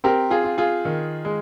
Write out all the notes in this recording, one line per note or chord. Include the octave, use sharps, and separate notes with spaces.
C4 G4 A#4
F4 G#4
F4
F4 G#4
D#3
G#3